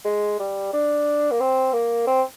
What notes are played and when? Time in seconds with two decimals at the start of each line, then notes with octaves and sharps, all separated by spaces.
0.05 G#3
0.39 G3
0.73 D4
1.31 A#3
1.40 C4
1.73 A#3
2.07 C4